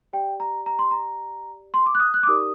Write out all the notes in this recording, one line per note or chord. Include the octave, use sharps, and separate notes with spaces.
G4 D5 G5
A#5
A#5
C6
A#5
C6
D6
F#6
D#6
F#6
D6
D#4 G4 A#4 D5 D#6